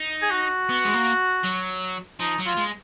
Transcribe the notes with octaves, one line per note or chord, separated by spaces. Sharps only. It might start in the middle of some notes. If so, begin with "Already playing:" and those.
Already playing: D#4
G#4
F#4
B3
G#3
A#3
F#3
F3 D#4
F#3
F4
G#3